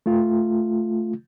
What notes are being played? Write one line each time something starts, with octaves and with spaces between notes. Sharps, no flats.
A3 F4